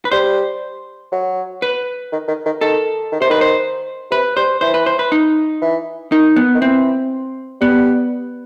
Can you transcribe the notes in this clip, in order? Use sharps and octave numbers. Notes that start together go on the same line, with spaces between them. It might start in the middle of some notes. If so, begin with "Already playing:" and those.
B4
G3 C5
F#3
B4
D#3
D#3
D#3
D#3 A4
D#3
C3 C5
D#3 B4
C5
C3 B4
G3 C5
E3 C5
B4
C5
B4
D#4
E3
D#3 D#4
B3
D#3
E3 C4
G3 B3